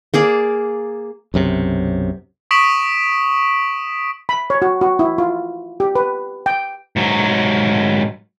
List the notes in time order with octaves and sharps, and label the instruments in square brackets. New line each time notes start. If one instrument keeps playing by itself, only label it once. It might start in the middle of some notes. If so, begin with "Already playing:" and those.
[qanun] A#3 G#4 D5
[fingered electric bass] B1 F#2 C3
[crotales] C#6 D#6 B6 D7 E7 F#7
[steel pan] B5
C#5
F#4
F#4
E4
F4
G4
B4
G5
[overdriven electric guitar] G#2 F#3